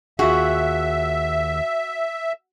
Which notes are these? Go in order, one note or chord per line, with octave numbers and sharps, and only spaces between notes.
D#2 F4 F#4 G#4 E5